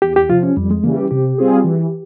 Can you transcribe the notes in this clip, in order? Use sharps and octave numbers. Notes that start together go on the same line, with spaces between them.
E2 G4
G4
C3 F3 F4
C#4
F2 G3
G#3
C#3 E3 G3 A#3
G4
C3 G4
G3 C4 F4 G#4
E3